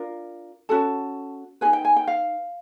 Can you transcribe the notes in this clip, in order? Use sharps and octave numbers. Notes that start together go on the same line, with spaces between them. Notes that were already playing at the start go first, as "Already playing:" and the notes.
Already playing: D4 F4 A#4
C#4 F#4 A4 A5
D#4 G#4 B4 G#5
G5
G#5
G5
F5